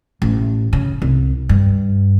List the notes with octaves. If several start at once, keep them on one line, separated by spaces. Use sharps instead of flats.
A1
C#3
C2
G2